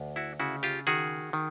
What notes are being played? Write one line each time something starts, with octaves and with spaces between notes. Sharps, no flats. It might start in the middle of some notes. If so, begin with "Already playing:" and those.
Already playing: D2
E4 F#4
C#3 E4 F#4
F4 G4
D#3 F#4 G#4
D#3